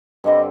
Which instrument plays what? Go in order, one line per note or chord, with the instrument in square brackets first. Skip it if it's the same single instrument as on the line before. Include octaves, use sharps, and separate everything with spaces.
[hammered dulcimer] G2 D3 G3 C4 [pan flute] D#5